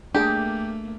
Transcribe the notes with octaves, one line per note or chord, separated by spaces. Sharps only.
A3 A#3 D4 G4 G#4 G5